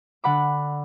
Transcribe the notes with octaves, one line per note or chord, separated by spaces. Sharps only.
D3 F#5 B5 D6